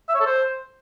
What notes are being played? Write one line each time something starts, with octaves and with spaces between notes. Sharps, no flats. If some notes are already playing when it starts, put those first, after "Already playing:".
E5
C#5
A4
C5